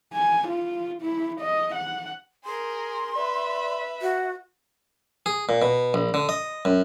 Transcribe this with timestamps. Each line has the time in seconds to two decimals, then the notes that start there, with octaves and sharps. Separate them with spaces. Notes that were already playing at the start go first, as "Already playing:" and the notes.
0.14 G#5
0.48 F4
1.02 E4
1.41 D#5
1.75 F#5
2.45 G#4 A#4 C6
3.15 B4 D5 E5
4.02 F#4 E5
5.26 G#4
5.49 A#2
5.62 B2
5.94 A#1
6.14 D3
6.29 D#5
6.65 F#2